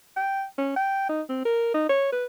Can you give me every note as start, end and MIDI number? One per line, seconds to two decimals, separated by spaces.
0.17 0.44 79
0.58 0.71 61
0.76 1.04 79
1.09 1.22 63
1.29 1.43 60
1.45 1.69 70
1.74 1.89 63
1.89 2.11 73
2.12 2.25 71